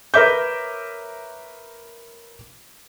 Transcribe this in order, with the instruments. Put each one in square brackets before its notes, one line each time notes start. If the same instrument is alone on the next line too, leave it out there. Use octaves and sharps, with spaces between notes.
[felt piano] A#4 B4 C#5 E5 D6 G6